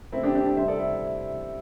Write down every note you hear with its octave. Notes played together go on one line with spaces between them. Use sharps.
C3 A3 C4 E4
D4 G4
D4 G4
D4
C3 G3 C4 C5 E5
A4 D5
E4 A4